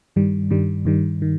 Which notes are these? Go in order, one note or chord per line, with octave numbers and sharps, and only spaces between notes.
G2 D#3 G3
G2 D#3 G3
G2 D#3 G3
D#3